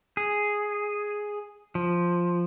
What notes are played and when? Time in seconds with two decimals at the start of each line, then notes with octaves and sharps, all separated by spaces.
0.17 G#4
1.75 F3